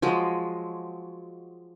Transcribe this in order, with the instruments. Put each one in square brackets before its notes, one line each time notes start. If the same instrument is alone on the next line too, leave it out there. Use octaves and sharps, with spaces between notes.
[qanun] F3 F#3 G#3